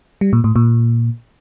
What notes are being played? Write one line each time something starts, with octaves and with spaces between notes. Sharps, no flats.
G3
A#2
A2
A#2